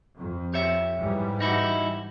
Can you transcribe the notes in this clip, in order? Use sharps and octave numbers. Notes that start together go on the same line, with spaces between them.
F2
G4 C#5 E5
G#2 E3 G3
D#4 E4 F#4